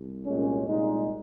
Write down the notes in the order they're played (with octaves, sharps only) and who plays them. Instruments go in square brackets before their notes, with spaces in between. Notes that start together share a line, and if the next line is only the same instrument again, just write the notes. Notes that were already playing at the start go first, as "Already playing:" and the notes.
Already playing: [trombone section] C2
C2 A#2 G#3 C#4
C2 A#2 G#3 D#4